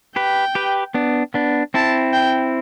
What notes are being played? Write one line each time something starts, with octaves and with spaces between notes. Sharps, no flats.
G4 B4 G5
G4 B4
B3 D4
B3 D4
C4 E4 A5
G5